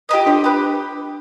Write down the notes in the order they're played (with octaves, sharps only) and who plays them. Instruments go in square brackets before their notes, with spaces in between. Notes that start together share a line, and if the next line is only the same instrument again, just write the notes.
[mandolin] B4 D#5
[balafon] F4 [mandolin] G4
[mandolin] C4 [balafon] D4
[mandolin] G4 B4